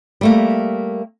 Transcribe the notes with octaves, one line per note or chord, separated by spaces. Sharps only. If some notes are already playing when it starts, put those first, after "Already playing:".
G3 A3 A#3